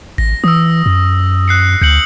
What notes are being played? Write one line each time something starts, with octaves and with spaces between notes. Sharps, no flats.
A1 A#6
E3 D#6 E6
F#2
F#6 C7 C#7
D2 G6 C#7 F#7